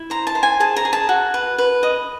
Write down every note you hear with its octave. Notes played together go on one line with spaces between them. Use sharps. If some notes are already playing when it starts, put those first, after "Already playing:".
Already playing: E4
C5 A#5
A5
C5
G#5
G#4 A5
A#5
G#4
A5
F#4
B4
B4
D#5